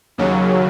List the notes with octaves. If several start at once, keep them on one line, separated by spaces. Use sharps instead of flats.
D#2 C#3 F#3